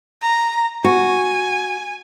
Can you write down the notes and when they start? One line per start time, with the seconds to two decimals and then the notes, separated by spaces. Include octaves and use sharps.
0.22 A#5
0.84 F#4 G#5